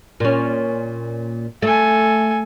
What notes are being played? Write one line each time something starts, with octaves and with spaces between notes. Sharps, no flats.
A#2 C#4
A3 A4 G#5